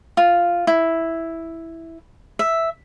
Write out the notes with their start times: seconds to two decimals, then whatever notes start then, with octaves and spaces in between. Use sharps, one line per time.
0.17 F4
0.67 E4
2.39 E5